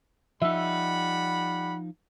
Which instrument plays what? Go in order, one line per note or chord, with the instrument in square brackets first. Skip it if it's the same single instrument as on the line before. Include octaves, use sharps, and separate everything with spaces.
[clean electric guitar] F3 D#4 [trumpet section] G3 F#5 B5 [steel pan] E5